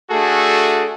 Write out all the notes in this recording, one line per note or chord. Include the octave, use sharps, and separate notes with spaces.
A3 D4 F#4 G#4 A4